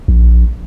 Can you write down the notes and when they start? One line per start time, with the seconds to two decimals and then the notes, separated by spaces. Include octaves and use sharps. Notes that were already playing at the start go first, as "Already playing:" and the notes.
0.08 A#1